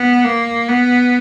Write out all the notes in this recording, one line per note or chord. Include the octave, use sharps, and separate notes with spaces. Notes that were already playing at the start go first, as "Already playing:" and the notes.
Already playing: B3
A#3
B3